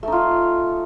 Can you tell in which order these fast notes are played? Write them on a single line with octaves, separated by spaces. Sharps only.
A3 D#4 F4